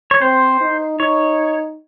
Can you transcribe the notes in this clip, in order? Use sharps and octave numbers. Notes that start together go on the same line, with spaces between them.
C#5
C4 C5
D#4
D#4 C#5